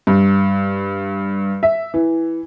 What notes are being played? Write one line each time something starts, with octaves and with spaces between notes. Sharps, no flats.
G2
E5
E3